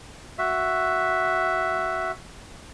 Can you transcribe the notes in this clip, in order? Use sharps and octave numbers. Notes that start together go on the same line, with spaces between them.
F#4 E5